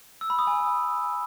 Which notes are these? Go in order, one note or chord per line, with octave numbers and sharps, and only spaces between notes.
E6
B5
D#6
G#5